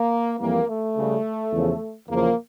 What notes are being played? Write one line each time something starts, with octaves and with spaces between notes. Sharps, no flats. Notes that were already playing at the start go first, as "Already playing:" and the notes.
Already playing: A#3
F2 E3 G3 A#3
A3
C#2 C#3 G3
E2 C#3 F3
E2 C#3 F3 A#3